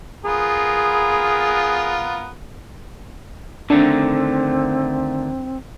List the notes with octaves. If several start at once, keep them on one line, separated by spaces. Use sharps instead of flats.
B3 F4 G#4 A#4
D3 D#3 A3 C4 D4